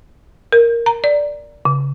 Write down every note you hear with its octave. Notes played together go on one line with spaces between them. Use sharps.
A#4
A#5
D5
C#3